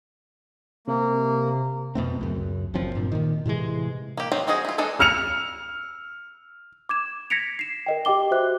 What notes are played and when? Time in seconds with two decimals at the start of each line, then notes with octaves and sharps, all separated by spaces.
0.87 C3 A#3
1.95 F2 B2 A3 C4
2.21 C#2 F#2
2.74 F#1 F#2 F3 C4
2.95 G2 A#2
3.12 A#2 D#3
3.46 A2 C3 E3 G#3
4.17 A#3 G4
4.32 D#3 F#3 C4 F4
4.47 G3 C4 F#4 G#4 D#5
4.65 E4 F4
4.78 E3 G#3 D4 D#4 A4
4.99 E6 F6 C#7 F7
6.89 D6 G#6 E7
7.30 G#6 A#6 B6 C#7 D7 F7
7.59 C7 E7
7.86 A#4 D#5 G5
8.05 G4 D#5 G5 D6 G7
8.31 F#4 C5 E5 D6 F#6